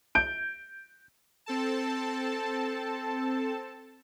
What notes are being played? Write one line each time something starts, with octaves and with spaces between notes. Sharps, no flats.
G6 D7
C4 A4 A5